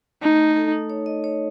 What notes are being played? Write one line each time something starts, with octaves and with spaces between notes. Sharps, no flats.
A3 D#4
A4
D#4
C#5
D#5
C#5